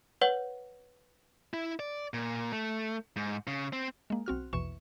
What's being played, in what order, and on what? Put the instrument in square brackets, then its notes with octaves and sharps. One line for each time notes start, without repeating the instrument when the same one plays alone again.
[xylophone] B4 C#5 F#5 F#7
[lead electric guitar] E4
D5
A#2
A3
G#2
C#3
C4
[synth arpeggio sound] G#3 A#3
B1 C4 F#4 F6
A#1 E2 B2 E3 C#6 E7